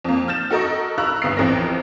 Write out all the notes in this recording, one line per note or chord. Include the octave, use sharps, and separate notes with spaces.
F2 A#3
F6 G6 A6 E7
F#4 A4 A#4 D#5 C#6
F5 A#5 B5 C#6 E6 F#6
G1 D2 B3 F5 D#6 C7
A1 F2 C4 A#4 A#6